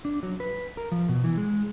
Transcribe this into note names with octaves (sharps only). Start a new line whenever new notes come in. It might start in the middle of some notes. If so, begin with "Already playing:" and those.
D4
F#3
B4
A#4
F3
B2
E3
G#3